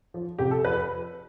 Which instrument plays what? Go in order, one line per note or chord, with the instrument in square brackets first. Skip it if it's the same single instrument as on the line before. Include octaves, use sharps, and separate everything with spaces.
[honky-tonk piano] F3
C3 G4
A4
F3 B4